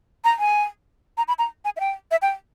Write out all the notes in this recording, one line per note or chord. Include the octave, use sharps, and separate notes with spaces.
A#5
G#5
A#5
B5
A#5
G#5
E5
G5
E5
G5